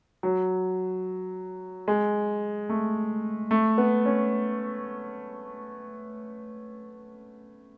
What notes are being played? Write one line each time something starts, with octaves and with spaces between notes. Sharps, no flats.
F#3
G#3
A3
A3
B3
C#4